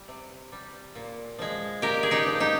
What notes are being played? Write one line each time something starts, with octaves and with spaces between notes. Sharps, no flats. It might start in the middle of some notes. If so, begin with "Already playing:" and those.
Already playing: G3
C3
G3
A#2
F3 G#3
A#2 G4 A#4
G#4
D#4 G4
F3 G#3
D#4 G4